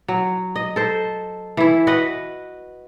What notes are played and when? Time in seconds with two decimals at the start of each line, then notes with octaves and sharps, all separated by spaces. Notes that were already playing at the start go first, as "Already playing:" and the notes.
0.08 F#3
0.56 D#5
0.76 A4 C5
1.57 E3 E4
1.87 F#4 B4 D#5 F#5